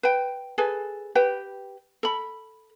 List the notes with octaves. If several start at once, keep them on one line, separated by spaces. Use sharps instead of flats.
B4 G5
G#4 A4 B4 G#5
G4 B4 G5
A4 B5